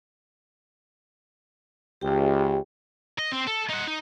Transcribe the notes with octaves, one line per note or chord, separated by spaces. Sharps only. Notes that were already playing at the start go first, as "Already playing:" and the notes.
C#2 G4 G5
D#5
C4
A4
D#4 F#5
D#4